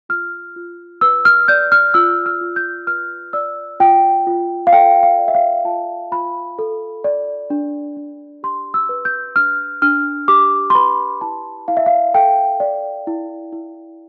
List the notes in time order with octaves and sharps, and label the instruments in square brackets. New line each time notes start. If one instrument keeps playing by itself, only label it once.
[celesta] F4 F6
F4
B4 E6
F6
D5 G6
F6
F4 E6
F6
F4
G6
B4 F6
D5 E6
F4 G5
F4
F5
A4 G5
F5
D5
E5
F5
F4 A5
F4 B5
A4
D5
D4
D4
G4 C6
E6
B4
G6
D4 F6
D4 F6
G4 D6
C6
B4 B5
E4 A5
E4 F5
E5
F5
A4 G5
D5
E4
E4